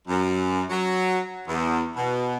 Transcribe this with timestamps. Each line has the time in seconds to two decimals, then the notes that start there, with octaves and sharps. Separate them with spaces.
0.08 F#2
0.70 F#3
1.47 E2
1.95 B2